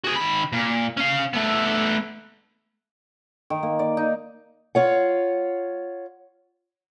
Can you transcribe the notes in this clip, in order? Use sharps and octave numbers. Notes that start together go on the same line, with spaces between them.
F#4 G#4
D#3 B5
A#2
C#4 F5
A3 B3
D#3
A#3
D5
D#4
F4 C#5 F#5